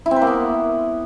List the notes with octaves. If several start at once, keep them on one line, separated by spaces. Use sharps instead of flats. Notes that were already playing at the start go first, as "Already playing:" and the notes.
E4
C4
B4
A#3
B3